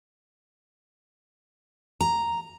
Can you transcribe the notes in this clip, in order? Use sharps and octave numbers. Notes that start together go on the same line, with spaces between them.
A#5